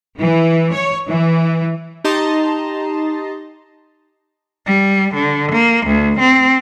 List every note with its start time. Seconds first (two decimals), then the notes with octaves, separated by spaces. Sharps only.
0.19 E3
0.72 C#5
1.08 E3
2.04 D#4 G4 D#5 A5 A#5 C6
4.66 G3
5.15 D3
5.52 A#3
5.86 D2
6.20 C4